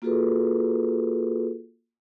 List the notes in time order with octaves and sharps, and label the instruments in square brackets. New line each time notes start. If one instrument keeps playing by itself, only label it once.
[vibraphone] A#3 F4 F#4 G#4 A4 B4